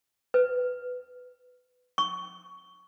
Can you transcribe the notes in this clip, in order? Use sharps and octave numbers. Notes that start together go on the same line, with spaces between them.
B4
C#6